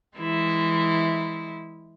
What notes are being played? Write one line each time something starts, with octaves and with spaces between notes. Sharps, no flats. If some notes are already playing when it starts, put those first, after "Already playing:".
E3 G#3 E4